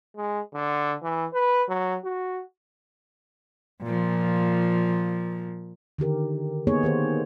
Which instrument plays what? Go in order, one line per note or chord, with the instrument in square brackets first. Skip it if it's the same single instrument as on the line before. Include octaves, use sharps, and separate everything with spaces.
[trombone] G#3
D3
E3
B4
F#3
F#4
[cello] A#2 F3
[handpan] D3 D#3 G4 A#4
A#3 B3 D#4 G#4 C#5
D#3 G4 C5